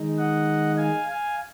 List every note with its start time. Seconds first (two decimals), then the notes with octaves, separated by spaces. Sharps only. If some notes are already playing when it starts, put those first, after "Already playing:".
Already playing: D#3 G#3 D#4
0.18 D#5 F#5
0.77 F5 G#5
1.08 F5 G#5